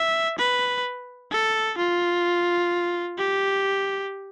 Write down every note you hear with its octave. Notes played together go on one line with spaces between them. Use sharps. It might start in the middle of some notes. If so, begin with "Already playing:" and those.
Already playing: E5
B4
A4
F4
G4